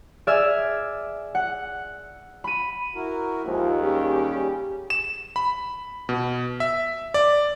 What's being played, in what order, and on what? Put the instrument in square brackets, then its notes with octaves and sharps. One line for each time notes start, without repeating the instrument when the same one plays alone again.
[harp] G#4 D5 E5 E6 F6 G#6
F#5
B5 D#7
[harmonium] E4 F#4 A#4
[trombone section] D#2 [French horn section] F3 [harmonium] G#3
[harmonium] G3 C#4 [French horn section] G4 G#4
[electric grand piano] E7
B5
B2
E5
D5